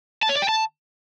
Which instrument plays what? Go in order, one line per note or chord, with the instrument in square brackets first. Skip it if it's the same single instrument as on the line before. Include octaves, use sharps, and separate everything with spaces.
[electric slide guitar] A5
C#5
D5
G5
A5